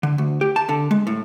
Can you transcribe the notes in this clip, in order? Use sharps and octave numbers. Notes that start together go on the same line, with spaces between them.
D3
D2
G4
A5
D3
G#3
A2